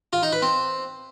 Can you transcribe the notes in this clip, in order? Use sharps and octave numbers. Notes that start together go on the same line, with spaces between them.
F4
D#4
B4
C4